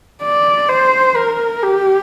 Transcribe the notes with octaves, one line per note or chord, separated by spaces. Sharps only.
D5
C5
A#4
G4